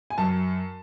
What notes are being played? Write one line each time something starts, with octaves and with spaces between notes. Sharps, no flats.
G#5
F#2 A5